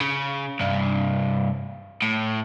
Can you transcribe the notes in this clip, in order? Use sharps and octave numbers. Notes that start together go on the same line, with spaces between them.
C#3
C2 G2
A2